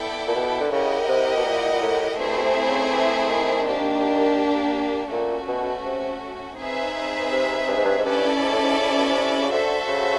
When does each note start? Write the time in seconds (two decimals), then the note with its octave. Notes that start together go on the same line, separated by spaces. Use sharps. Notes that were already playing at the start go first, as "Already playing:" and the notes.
Already playing: B3 E4 A4 D5 G5
0.27 A#2
0.35 B2
0.61 D3
0.72 C#3 E4 G4 A#4 D#5 F#5
1.08 C3
1.37 B2
1.45 A#2
1.72 A#2
1.82 A2
2.18 G2 A3 C4 E4 G#4 C5
2.37 B2
2.43 C3
2.67 C#3
2.92 E3
3.28 D#3
3.65 A#3 D4 G4
5.12 A#2 A3 C#4 F#4
5.48 B2
5.85 C3
6.58 C4 D#4 G#4 B4 E5
7.31 C3
7.68 G2
7.77 G#2
7.85 G2
7.98 G#2
8.05 G2 C#4 E4 A4 D5
8.42 G#2
8.52 A2
8.62 G#2
8.78 C#3
8.88 C3
8.98 B2
9.08 C3
9.42 C#3
9.52 D3 F#4 A4 C5 E5
9.88 C#3